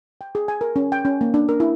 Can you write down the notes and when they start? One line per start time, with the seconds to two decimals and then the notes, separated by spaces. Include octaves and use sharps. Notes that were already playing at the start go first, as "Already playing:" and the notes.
0.21 G5
0.35 G#4
0.48 G#5
0.61 A#4
0.76 C#4
0.92 G5
1.05 C#4
1.21 A#3
1.34 D4
1.49 A#4
1.60 E4